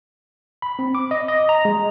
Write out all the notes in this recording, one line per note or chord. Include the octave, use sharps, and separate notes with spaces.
B5
C4
D6
D#5
D#5
A#5
G#3